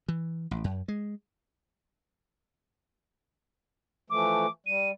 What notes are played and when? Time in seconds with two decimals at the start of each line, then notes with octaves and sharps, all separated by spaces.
0.09 E3
0.51 A1
0.64 F#2
0.88 G#3
4.10 E3 F3 A3 D6
4.66 G3 D#7